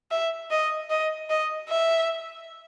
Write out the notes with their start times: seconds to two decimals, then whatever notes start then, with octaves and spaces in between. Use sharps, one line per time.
0.11 E5
0.51 D#5
0.90 D#5
1.30 D#5
1.69 E5